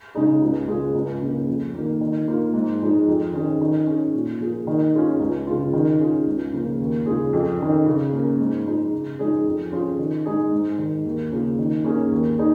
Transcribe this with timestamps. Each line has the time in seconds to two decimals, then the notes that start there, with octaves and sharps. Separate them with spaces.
0.15 C#3 G#3 D#4 G#4
0.42 C#2
0.68 C#3 G#3 F4 G#4
0.95 C#2
1.22 C#3 A#3
1.48 F2
1.74 D#3 A#3
2.01 D#3
2.28 A#3 F4
2.54 G#2
2.81 F3 G#3 D#4 G#4
3.08 F2
3.33 D#3 C#4 G#4
3.61 D#3
3.87 C#4 G#4
4.13 A#2
4.40 F3 A#3 F4 G#4
4.67 D#3
4.94 C#4 F4 G#4
5.20 C#2
5.47 C#3 G#3 F4
5.73 D#3
6.00 C#4 F4 G#4
6.27 C#2
6.53 C#3 F3 A#3
6.80 D#2
7.06 C#3 G#3 F4 G#4
7.33 F2
7.59 D#3 C#4
7.86 C#3
8.12 A#3 C#4
8.40 G#2
8.66 F3 G#3 D#4
8.92 C#3
9.19 F3 G#3 D#4 G#4
9.46 F2
9.72 F3 C#4 F4 G#4
9.99 D#3
10.26 G#3 D#4 G#4
10.51 G#2
10.78 D#3 G#3
11.05 D#2
11.32 C#3 A#3 F4 G#4
11.59 D#3
11.84 A#3 C#4 G#4
12.11 D#2
12.38 D#4 G#4